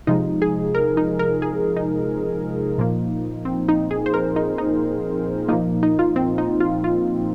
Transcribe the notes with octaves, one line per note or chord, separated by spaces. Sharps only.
C3 F3 G#3 D#4
G#4
A#4
D#4
A#4
G#4
D#4
A#2 F3 A#3
C4
D#4
G#4
C5
A#4
D#4
D#4
A#2 F3 A#3 D#4
D#4
F4
C4
D#4
F4
F4